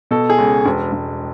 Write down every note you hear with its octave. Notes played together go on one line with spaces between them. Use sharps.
B2 A4
G#4
C#2
E1
E1